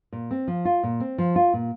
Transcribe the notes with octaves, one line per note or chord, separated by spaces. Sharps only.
A#2
C4
F3
F4
A#2
C4
F3
F4
A#2